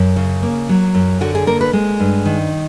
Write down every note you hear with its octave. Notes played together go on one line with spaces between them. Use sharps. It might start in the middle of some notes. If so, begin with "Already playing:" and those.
Already playing: F#2
C#3
A#3
F#3
F#2
D3 F#4
G#4
A#3 A#4
B4
G#3
G2
D#3